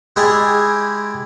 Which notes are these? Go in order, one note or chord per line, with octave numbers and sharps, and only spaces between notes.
G#3 E4 G4 G#4 D5